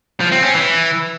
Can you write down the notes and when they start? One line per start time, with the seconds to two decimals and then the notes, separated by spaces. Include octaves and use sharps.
0.21 F3
0.32 C4
0.43 C#4
0.54 E3